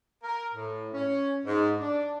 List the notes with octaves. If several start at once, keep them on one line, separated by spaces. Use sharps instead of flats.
A#4
A2
C#4
G#2
D4